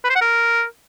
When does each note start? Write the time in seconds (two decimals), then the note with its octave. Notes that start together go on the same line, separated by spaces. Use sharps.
0.04 B4
0.10 C5
0.16 F#5
0.21 A#4